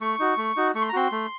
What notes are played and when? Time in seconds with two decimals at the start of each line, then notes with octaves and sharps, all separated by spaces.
0.01 A3 C#6
0.19 D#4 F#4
0.37 A3
0.56 D#4 F#4
0.75 A3 C#6
0.82 C6
0.89 A#5
0.93 C4 F#4 C6
1.12 A3